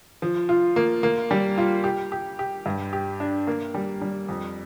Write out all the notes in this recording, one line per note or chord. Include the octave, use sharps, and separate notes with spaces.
F3
F4
A#3
A#3
G3
F4
G4
G4
G4
G2
G4
D4
A#3
G3
G3
F2